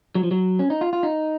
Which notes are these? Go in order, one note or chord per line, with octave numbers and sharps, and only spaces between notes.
F#3
F3
F#3
C#4
D#4
F4
F4
D#4